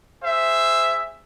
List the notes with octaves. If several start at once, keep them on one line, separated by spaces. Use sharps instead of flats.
G#4 C5 E5